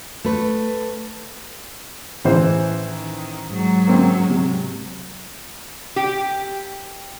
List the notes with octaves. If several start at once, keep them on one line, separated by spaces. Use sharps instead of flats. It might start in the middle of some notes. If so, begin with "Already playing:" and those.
A3 B4
A1 E3 C5
D#3
G#2 F#3
A#3 C4 C#4
C3
G4